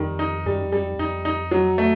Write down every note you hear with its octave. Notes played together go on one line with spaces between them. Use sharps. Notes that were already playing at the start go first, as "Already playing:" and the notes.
Already playing: F2 D#3 G3
D#4
F#2 G3
F2
F#2 G3
F2
F2 D#4
D#4
F#3
A3